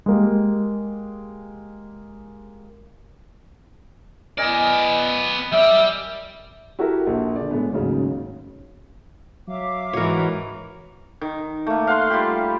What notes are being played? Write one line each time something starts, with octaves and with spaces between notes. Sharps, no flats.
G#3 A#3 G4
B3 A#4 D5 D#5 G#5
G3 D5 E5
E4 F#4 G4 A4 A#4
A#1 A#3
D3 G#4 D5
A2 G#3 B3
A1 D#2 G#2 C#3 F#3
F#3 E5 F5 D6
G#2 E3 F#4 A#4 C#5
D#3
A3 A#3
F5 F#5 C6
G3 F4 G4